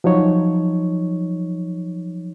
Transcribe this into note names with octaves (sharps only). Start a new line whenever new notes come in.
F3 F#3 D#4 C#5